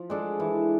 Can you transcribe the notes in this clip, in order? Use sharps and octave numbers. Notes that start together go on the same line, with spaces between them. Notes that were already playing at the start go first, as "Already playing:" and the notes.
Already playing: F3
G#3 D4 A4
E3